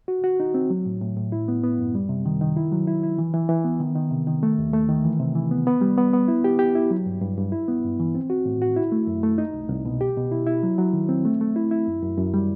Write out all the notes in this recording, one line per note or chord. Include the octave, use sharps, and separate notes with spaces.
F#4
F#4
D#4
C4
F#3
A2
A2
A2
E4
B3
B3
F#2
G3
C3
D#3
D#3
E4
F#3
E4
E4
E3
E3
E3
B3
D#3
D#3
C3
D#3
A3
D#2
A3
D#3
E3
C3
E3
B3
B3
G3
B3
B3
E4
G4
G4
E4
F#3
G2
G2
G2
E4
B3
G2
E3
C4
F#4
A2
F#4
E4
A3
F#2
A3
D#4
C2
C2
B2
G4
B2
E4
E4
F#3
F#3
D#3
C4
A3
A3
E4
E4
F#2
F#2
F#2
G3